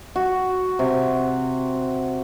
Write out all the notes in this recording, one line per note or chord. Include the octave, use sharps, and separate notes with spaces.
F#4
C3